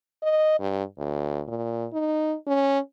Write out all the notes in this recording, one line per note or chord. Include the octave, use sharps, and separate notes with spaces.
D#5
G2
D2
A#2
D#4
C#4